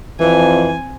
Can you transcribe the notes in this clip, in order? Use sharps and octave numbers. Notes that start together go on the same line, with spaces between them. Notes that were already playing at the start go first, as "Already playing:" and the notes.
F2 E3 C4 G#5